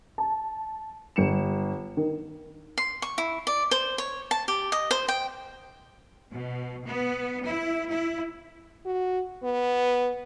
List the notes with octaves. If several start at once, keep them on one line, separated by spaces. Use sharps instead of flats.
A5
G1 C#7 E7
D#3
C6
C#6
E4
D5
C5
C#5
A5
G4
D#5
C5
G5
B2
B3
E4
E4
F#4
B3